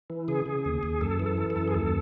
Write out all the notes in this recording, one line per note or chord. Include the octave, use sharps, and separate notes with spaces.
E3
C#3 G#4
C#3
D#2
D#2
F#2 A4
E3
A4
E3
A4
F#2
G#4
D#2 A4